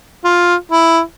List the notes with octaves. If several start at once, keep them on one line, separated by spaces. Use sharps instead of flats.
F4
E4